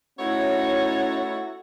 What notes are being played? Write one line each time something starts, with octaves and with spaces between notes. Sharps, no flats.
A3 B3 C#4 D#4 E4 F#4 C#5